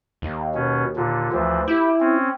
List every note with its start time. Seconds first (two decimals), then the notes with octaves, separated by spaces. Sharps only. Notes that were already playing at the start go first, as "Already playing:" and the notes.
0.22 D#2
0.55 B2 C#4
0.96 A#2 D3
1.32 D2 E3 F3
1.68 E4 G4 G5
2.00 C4 C#4